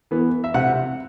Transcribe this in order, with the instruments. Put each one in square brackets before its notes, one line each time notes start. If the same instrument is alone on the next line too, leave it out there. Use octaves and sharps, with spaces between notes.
[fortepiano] E3 B3
E5
C3 F#5